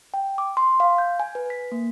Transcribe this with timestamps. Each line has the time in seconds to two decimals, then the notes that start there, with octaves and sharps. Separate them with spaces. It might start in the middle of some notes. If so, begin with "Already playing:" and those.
0.14 G5
0.38 D6
0.57 C6
0.80 F5
0.98 G6
1.20 G#5
1.35 B4
1.50 B6
1.72 A#3